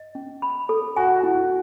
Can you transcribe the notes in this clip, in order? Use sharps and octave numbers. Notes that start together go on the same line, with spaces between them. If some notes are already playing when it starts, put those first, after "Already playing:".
Already playing: D#5
C#4
B5
A4
F#4 G#5
F#4
E4
F#4